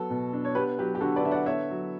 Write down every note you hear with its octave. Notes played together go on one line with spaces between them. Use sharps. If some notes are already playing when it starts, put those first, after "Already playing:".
Already playing: F#3 B3 A4
B2
D4
C#5
B3 G4 B4
F#3 G4 B4
G4
D3 F#4 A4
B4 D5
D3 E5
D5 F#5
B3 C#5 E5
F#3